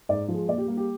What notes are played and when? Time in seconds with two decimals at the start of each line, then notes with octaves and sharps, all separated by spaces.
0.09 G#2 D5
0.28 F3
0.34 G#3
0.48 A#2 D5
0.58 G4
0.67 G3 A#3
0.77 G4